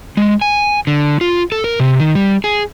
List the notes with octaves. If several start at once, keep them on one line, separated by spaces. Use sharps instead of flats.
G#3
G#5
D3
F4
A4
A#4
C3
D#3
G3
G#4